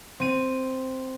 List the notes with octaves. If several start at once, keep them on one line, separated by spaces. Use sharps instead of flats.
C4 D#7